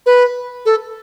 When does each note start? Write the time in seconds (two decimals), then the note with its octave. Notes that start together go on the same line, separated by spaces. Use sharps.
0.06 B4
0.66 A4